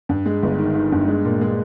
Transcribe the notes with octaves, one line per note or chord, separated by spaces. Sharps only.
G2
G#3
G1
D#3
D#3
G2
G#3
A#2
G#3